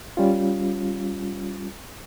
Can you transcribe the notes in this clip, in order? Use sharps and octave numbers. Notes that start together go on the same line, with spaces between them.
G3 C#4 F4